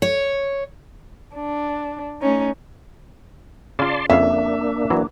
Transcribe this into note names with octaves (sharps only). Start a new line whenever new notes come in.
C#5
D4
A3 C#4 D#4
C#3 F4 D5 A5 C6
F2 C#3 A#3 D4 E5 F5
E3 F#3